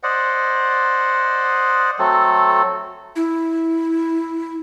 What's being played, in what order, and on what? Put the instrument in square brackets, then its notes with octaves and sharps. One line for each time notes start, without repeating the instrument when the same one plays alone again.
[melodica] C5 D5 D#5 F#5
F#3 A3 C4 A4
[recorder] E4